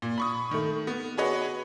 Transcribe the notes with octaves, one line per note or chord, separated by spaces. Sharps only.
A#2
B5 C#6 D#6
D#3 A3
B3
F#4 G#4 B4 C#5 D#5 F#5